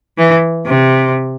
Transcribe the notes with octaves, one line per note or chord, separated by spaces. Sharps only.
E3
C3